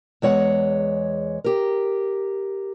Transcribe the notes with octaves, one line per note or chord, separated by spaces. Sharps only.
E2 G#3 C#5 F#5
G4 A#4